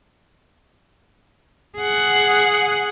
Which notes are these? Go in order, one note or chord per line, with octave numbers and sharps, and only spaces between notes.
G#4 F#5